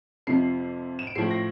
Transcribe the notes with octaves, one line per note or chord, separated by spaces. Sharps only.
F2 C3 F3 C7
E7
D7
A2 F3 A3 C7
A#6